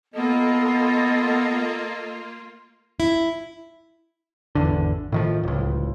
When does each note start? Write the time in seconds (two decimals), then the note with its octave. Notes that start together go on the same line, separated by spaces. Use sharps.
0.14 A#3 B3 F4 A4 D#5
3.00 E4
4.55 G#1 E2 D3
5.12 A2 D#3 F3
5.43 D1 C#2